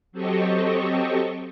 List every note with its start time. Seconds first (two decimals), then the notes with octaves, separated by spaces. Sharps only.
0.12 F#3 C4 G4 A4 D#5 C#6